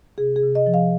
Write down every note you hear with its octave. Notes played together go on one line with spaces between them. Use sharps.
C3 G#4
G#4
C3
D#5
F3
F5